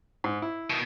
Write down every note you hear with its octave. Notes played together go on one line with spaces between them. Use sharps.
G#2
E4
B2 D#3